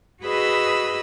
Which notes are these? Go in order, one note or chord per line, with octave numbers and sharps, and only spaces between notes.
F#4 G#4 B4 D#5 B5 E6